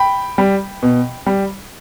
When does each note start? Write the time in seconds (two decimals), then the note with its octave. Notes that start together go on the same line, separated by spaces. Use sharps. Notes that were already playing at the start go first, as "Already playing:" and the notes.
Already playing: G5 B5
0.38 G3
0.82 B2
1.26 G3